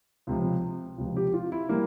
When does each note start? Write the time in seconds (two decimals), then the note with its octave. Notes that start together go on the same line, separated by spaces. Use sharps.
0.27 C#2 C3 F3
0.98 C#2 C3 F3
1.17 G4
1.34 F4
1.52 E4
1.69 E3 G3 A#3